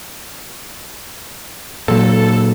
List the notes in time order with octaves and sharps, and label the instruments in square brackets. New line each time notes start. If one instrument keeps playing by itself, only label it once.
[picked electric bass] A#2 F#3 [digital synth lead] A4